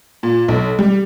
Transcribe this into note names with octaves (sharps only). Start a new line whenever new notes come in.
A#2
B1
G3